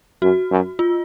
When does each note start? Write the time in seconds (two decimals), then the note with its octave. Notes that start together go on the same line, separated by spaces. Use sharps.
0.22 F#2 F#4
0.51 F#2
0.79 F4